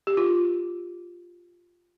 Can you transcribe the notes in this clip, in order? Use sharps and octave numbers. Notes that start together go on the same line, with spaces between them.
G4
F4